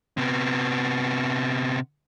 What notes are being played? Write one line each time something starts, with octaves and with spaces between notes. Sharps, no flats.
C3 B3